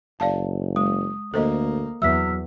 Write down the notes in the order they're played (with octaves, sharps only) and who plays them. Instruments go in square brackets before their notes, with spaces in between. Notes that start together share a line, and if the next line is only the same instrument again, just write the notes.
[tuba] F#1 [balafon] D5 F5 A5
[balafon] G#3 [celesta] D#6
[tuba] D2 [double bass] A#3 [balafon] A4 C5 D#5
[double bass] E2 [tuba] F#3 [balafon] E5 [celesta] E6 F6 B6